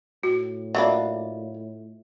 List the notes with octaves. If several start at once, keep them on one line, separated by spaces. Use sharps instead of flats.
A2 F#4
F#3 A#3 D4 F4 D#5 E5